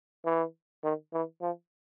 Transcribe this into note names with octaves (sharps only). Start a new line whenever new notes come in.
E3
D#3
E3
F3